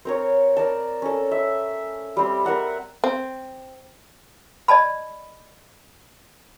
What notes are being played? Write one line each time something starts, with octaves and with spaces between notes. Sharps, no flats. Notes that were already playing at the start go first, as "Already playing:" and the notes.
C4 A#4 C#5
A#4 D5 A5
C#4 A4
E5
G3 C4
A#4 E5 F#5 A#5
C4
D5 D#5 A5 B5